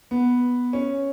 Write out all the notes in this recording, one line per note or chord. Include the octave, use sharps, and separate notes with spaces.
B3
C#4